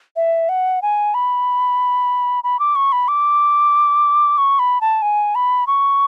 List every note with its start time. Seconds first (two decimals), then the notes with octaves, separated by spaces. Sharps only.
0.16 E5
0.49 F#5
0.82 G#5
1.14 B5
2.44 B5
2.59 D6
2.75 C#6
2.92 B5
3.08 D6
4.38 C#6
4.59 B5
4.81 A5
5.02 G#5
5.35 B5
5.67 C#6